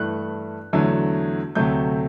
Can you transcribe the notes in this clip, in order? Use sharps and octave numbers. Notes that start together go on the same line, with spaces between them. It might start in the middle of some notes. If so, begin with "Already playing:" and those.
Already playing: G2 E3 A3 F#6
E2 D3 F#3 A3
D2 C3 F#3 A3 G6